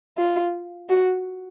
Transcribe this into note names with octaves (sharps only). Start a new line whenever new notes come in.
F4
F#4